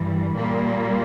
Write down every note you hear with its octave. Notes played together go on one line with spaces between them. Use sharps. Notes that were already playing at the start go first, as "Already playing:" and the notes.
Already playing: G2 E3 G3
A#2 G3 A#3